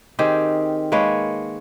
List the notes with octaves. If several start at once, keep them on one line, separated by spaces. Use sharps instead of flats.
D#3 C4 G4 G#4
G#3 A#3 B4 C#5